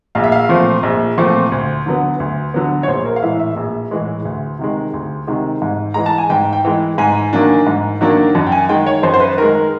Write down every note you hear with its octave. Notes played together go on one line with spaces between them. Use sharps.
A#1 F5
E5
F5
A#2 F3 A3 C4
A#1
A#2 F3 A3 C4
D2
D3 F#3 B3
D2
D3 F#3 B3
C#5
A#1 C5
A#4
F5
A2 E3 G#3 E5
E5
A#1
A2 E3 G#3
D2
C3 D#3 G#3
D2
C3 D#3 G#3
G#2
E3 G#3 A#5
A5
G#5
G#2 G5
G5
E3 G#3
G#2 G#5
D#3 F#3 A#3 D4
G#2
D#3 F#3 A#3 D4
F#2
G5
G#5
D#3 G#3 G5
C#5
F#2 C5
C5
B4
D#3 G#3 A#4
A#4